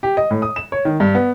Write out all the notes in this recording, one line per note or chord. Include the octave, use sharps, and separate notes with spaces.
G4
D#5
A2
D#6
E7
C#5
D#3
G2
B3